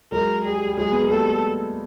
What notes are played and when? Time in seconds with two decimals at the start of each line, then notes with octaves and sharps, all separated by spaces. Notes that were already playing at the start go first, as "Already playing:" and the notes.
0.12 F#3 G#3 A#4
0.45 G3 G#4
0.55 G3
0.67 G3
0.77 F#3 G#3 G#4
0.91 B3
1.01 A#3
1.10 G3 A3 A4